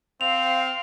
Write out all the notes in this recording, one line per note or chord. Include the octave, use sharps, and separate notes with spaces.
C4 F5 F7